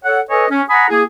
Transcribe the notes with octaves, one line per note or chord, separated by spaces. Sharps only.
A4 C#5 F#5
A4 B4 C#5 D#5 G#5
C#4
F#5 G#5 A#5 B5 D#6
A#3 E4 G#4